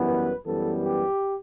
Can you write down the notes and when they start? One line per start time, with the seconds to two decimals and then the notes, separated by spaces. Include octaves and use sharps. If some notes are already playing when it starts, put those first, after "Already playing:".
Already playing: F#2 E3 G3 B3
0.08 B4
0.45 F#2 E3 G3 B3 A4
0.83 G4